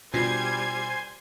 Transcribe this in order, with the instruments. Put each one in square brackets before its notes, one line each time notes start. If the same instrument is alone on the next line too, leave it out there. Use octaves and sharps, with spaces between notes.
[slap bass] B2 [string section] G3 G#6 [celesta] D4 F4 C7 [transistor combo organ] C5 G#5